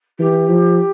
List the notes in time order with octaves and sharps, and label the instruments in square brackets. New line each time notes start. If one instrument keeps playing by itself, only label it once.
[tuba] E3 [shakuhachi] G4
[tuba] F3